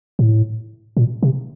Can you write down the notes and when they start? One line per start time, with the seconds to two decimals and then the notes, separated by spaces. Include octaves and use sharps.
0.19 A2
0.97 A#2
1.23 C3